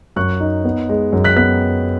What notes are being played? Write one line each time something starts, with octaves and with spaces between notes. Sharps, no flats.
F#2 C#6 F#6
D#4
B3
G#3
F#2
F#6 B6
B3 F#6 B6